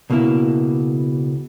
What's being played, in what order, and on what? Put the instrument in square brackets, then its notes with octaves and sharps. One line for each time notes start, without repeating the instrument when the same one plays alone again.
[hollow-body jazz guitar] C#2 B2 A#3 E4